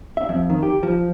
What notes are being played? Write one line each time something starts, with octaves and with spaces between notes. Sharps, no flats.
E5
F2
D#3
G4
F3